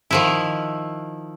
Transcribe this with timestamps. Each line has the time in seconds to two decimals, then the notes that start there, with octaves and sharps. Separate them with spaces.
0.11 D#3 F3 E4